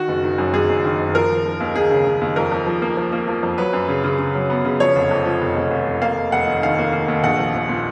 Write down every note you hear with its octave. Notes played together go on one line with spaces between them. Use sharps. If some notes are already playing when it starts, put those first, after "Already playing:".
Already playing: D#3 F#4
F#1
D#3
F#2
F#2 G#4
F#1
D#3
F#1
F3 A#4
F3
F3
D#2
D#2 G#4
C#3
C#3
D#2
F2 A#4
F2
F3
A#3
F3
A#3
F3
F2
F#3 B4
F#2
C#3
C#3
C#3
F#3
B3
C#3
F3 C#5
F1
F2
F3
F1
F1
F1
F1
A#3 F5
F1
F1 F#5
D#2
D#3 F5
A#3
A#3
D#2
A#1 F#5
F3
A#1
A#2